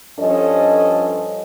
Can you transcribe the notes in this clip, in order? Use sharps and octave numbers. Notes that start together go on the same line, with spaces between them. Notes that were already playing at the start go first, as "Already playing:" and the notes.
G2 F3 C#4 A4 D#5